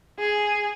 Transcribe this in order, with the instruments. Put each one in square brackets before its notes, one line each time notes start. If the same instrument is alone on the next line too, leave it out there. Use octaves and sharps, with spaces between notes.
[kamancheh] G#4